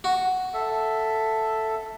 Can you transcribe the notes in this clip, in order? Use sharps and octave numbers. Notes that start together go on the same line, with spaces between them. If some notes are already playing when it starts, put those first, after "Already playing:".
F#4
A4 E5